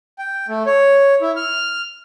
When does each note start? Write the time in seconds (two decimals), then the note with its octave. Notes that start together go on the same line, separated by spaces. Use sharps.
0.19 G5
0.48 A3
0.66 C#5
1.21 E4
1.36 F6